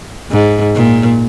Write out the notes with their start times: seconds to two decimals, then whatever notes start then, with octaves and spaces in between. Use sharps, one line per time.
0.31 G#2
0.76 A#2